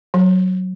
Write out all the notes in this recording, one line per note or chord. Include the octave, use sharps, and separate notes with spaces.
F#3